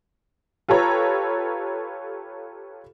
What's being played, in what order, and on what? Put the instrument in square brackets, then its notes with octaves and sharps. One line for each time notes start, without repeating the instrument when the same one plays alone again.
[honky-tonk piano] F4 G4 A4 B4 C#5 A#5